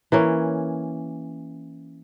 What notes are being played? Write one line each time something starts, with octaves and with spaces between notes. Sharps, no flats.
E3 A#3 C#4